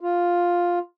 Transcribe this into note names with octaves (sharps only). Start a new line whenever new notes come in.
F4